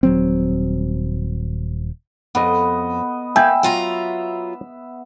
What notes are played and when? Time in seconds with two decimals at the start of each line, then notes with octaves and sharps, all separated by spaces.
0.03 D#1 F#3 C4
2.35 F2 B3 D#5
3.36 A#3 E5 G5 G#5
3.63 F#3 F4 A#5